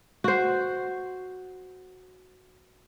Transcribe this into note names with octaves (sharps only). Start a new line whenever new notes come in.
F#4 C5